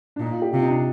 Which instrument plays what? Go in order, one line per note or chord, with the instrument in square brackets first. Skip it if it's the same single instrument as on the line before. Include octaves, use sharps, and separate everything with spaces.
[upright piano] D4
[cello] A#2 [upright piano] D#4
[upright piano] F4
G4
[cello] C3 [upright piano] F4
[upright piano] D#4
D4